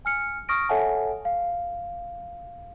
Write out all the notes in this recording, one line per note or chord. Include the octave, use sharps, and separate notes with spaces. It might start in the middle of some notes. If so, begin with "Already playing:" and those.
G#5 F6 C#7
C#6 D#6 F6 A#6 D7
A4 C#5 E5 F#5 G#5 A5
F5